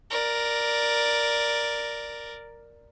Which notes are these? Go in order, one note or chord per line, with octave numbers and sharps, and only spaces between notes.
A#4 D5